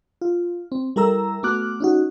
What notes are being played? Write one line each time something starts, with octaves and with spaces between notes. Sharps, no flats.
F4
C4
G3 E4 A4 A#4 A#5 E6
A3 B3 F#4 D6 F6 F#6
C#4 D#4 F#4